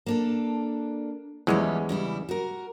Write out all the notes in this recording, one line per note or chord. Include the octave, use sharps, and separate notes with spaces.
A#3 D4 A4
E2 E3 F3 G3 G#3 C#4
C#3 G3 E4
F#4 A#4